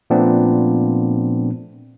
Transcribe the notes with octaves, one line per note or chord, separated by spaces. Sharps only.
A#2 F3 A3 B3 C4 D4